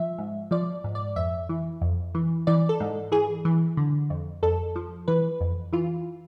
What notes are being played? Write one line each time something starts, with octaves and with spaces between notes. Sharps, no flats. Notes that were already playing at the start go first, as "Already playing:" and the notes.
Already playing: F3 E5
G#2
F3 D5
G#2
D5
F2 E5
E3
F2
E3
E3 D5
A4
G#2
E3 G#4
E3
D3
F2
F2 A4
F3
E3 B4
F2
E3 F4